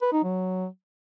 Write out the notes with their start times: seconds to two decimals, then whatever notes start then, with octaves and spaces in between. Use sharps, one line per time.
0.02 B4
0.13 D#4
0.23 F#3